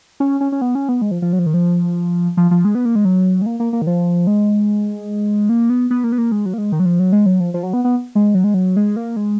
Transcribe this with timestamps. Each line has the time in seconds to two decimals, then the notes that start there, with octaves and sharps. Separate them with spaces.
0.20 C#4
0.41 C#4
0.52 C#4
0.62 B3
0.75 C#4
0.89 B3
1.02 G#3
1.11 F3
1.22 F3
1.33 F#3
1.39 F3
1.46 D#3
1.54 F3
2.37 F3
2.51 F3
2.65 G#3
2.75 B3
2.85 A#3
2.96 G#3
3.05 F#3
3.42 G#3
3.46 A#3
3.60 A#3
3.73 A#3
3.82 D#3
3.87 F3
4.27 G#3
5.49 A#3
5.70 B3
5.91 B3
6.04 A#3
6.12 B3
6.18 A#3
6.32 G#3
6.46 F#3
6.53 A#3
6.58 G#3
6.72 D#3
6.80 F#3
6.86 F3
6.99 F#3
7.12 G#3
7.26 F#3
7.40 F3
7.54 F3
7.63 F#3
7.73 B3
7.84 B3
8.15 G#3
8.35 F#3
8.44 G#3
8.54 F#3
8.77 G#3
8.96 A#3
9.16 G#3